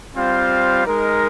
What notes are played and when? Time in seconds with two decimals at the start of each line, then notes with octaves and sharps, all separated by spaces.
0.16 G3 C4 F4 C5 F5
0.86 G#3 D#4 A#4